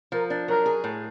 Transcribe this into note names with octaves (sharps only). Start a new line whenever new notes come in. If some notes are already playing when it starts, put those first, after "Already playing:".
F3 A#4
D4
F#3 A#4
G#4
A2